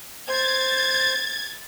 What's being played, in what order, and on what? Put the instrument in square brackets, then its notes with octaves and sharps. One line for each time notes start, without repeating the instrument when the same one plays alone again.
[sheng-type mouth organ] C5 [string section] G#6 A6